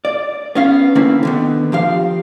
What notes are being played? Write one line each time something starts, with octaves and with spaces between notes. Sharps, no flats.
D5
B3 C#4 F5
D3 A#3 C4 C#4 E4
D3 D#3 B3
F3 G4 F5